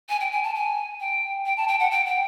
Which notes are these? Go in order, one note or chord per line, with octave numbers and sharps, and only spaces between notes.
G#5
G5
G#5
A5
G#5
G5
G5
A5
G5
F#5
G5
G5